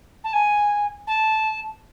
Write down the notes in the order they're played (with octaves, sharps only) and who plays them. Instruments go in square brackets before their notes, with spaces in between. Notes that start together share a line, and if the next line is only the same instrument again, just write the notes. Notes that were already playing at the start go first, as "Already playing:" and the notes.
[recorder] A5
G#5
A5